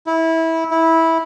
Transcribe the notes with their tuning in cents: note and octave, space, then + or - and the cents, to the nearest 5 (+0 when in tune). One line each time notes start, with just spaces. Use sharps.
E4 -20
E4 -15